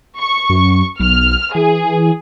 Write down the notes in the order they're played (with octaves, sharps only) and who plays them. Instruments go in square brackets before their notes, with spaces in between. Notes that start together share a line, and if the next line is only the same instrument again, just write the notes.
[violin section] C#6
[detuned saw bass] F#2
[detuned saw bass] B1 [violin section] F6
[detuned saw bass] E3 [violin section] G#4